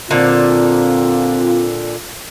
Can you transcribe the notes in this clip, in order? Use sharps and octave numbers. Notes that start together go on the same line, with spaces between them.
A#2 D3 C4 F4